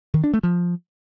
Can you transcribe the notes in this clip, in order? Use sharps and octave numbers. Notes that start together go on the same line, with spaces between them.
D#3
D4
A3
F3